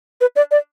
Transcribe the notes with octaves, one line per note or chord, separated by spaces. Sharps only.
B4
D5
D5